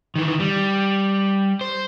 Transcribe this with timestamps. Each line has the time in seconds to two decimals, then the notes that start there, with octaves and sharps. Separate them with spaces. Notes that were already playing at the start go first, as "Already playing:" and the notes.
0.16 D#3 E3
0.40 G3
1.61 C5